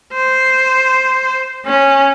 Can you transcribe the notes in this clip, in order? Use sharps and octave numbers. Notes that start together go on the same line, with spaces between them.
C5
C#4